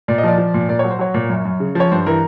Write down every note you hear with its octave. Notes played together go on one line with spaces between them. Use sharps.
A#2 D5
D#5
F3 D5
F3
A#2
A#2 D5
F#3 C#5
C5
F#3 C#5
A#2
F#2
F#2
C#3
F3 C#5
G2 C5
E3 A#4